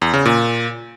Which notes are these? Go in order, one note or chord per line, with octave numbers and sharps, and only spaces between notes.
E2
C#3
A#2